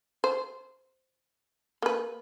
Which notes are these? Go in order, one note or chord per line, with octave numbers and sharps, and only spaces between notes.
C5
A#3 B4